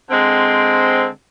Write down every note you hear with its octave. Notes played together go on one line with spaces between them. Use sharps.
D3 G#3 C4